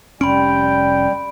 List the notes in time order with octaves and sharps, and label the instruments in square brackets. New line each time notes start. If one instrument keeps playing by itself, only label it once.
[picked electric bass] F1 C#4 [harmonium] G3 [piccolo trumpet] G5 [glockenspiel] B5 C6 D7